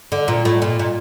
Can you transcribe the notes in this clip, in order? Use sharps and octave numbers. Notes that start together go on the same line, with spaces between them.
D3
A#2
A2
A#2
A#2